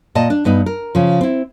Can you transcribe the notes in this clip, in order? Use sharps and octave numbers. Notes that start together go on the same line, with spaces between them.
A#2 D#5 A5
D4
G2 B3 D#4
A#4
C#3 F3
C4 E4